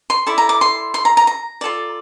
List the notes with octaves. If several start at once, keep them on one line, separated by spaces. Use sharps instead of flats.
C6
E4 A4 D5
A#5
D6
C6
C6
A#5
A#5
A#5
F4 A4 D5